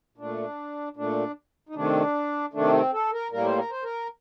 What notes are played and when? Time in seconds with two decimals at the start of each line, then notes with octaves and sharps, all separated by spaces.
0.18 A#2 A3 D4
0.96 A#2 A3 D4
1.69 D#4
1.75 C3 D#3 A3 D4
2.53 C3 D#3 A3 D4
2.73 C4
2.93 A4
3.13 A#4
3.32 A2 G3 A#3 A#4
3.45 C5
3.58 A#4
3.71 C5
3.84 A#4